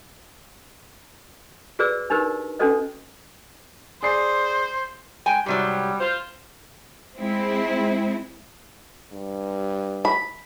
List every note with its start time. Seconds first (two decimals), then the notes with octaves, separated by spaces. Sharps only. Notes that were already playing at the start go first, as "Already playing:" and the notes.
1.79 F#4 G#4 B4 D5 E6
2.10 D4 D#4 G4 A#4 B4
2.59 C#4 D4 F#4 A4 B4 D#5
4.03 G#4 C5 D5 C7
5.26 G#3 G5 G#5
5.46 G#2 C3 F#3 G3
6.00 F4 C5
7.18 G#3 C4 E4
9.13 G2
10.05 B5